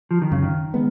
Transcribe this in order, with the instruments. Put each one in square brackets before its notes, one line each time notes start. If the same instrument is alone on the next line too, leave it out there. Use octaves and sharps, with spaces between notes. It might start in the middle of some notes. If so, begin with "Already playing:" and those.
[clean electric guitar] F3
D#3
[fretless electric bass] F#2 [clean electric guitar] C#3
[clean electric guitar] D#3
[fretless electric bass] G#3 B3